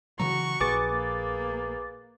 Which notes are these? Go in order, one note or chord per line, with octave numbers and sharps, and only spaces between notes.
C#3 E3 F#3 F#4 A#5 C#6
A#1 G#4 B4 G#5 D6 A6
A#3